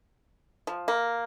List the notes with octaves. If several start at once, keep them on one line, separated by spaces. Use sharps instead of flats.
F3
A#3